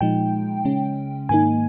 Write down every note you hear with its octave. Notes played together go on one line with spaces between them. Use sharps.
A#2 F3 G#3 D#4 G5
C#3 G#3 C#4
G#2 D#3 A#3 D#4 G#5